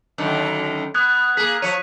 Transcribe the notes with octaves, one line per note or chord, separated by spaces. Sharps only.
F#2 D3 D#3
B3 D#6 F#6 G#6
A#3 G#4 B6
F3 C#5 B6 D#7